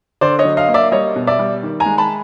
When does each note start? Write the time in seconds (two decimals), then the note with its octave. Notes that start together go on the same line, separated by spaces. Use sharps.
0.21 D3 C5 D5
0.39 C#5 D#5
0.45 F#3
0.57 D#5 F5
0.69 A#3
0.74 D5 E5
0.92 G3 C#5 D#5
1.16 B2
1.27 D5 E5
1.39 G3
1.63 D#3
1.80 G#5 A#5
1.86 G#3
1.98 A5 B5